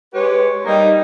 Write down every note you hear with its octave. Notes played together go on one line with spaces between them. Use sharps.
G#3 G4 B4 C#5
G3 A#3 D#4